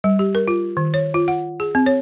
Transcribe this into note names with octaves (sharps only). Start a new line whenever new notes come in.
G3
G4
A#4
F4
D#3
C#5
F4
F#5
G#4
C4
C#5